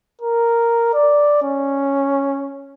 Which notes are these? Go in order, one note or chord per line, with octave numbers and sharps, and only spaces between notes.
A#4
D5
C#4